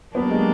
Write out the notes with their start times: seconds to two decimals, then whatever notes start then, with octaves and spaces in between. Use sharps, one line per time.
0.14 F#3 A#3 B3 D4 G4
0.31 G#3